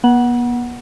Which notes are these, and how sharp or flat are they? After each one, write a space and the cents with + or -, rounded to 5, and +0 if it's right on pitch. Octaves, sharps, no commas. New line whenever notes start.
B3 -45 F#5 +0